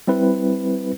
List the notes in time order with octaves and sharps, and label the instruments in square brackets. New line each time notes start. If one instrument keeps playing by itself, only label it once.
[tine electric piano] G3 C4 E4 B4